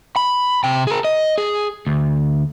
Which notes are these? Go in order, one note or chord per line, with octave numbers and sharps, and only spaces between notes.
B5
C3 G5
G#4 A#4
D#5
G#4
D2